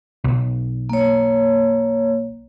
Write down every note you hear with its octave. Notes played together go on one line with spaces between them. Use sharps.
B1
A#3 C#5